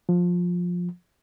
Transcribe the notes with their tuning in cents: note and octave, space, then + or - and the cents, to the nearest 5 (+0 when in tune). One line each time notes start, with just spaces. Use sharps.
F3 +15